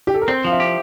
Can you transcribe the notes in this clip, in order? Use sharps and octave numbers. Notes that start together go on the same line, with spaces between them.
G4
A4
A#4
C4 C5
F3 F5
E5
G4